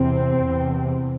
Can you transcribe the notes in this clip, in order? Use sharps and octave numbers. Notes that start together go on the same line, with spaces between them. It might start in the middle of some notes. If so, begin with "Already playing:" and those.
Already playing: E2 C3 C4
E2 C3